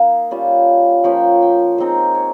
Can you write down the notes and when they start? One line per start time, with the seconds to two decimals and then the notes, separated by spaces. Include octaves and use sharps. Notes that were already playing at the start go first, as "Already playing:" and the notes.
Already playing: A#3 D#4 F5
0.31 G3 C#4 F4
1.04 F3 A#3 C#4 G5
1.42 G5
1.78 G#3 C4 D#4 C5
2.15 C#5